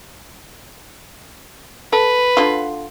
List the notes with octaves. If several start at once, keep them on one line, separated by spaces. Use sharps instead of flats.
A4 B4
D3 F4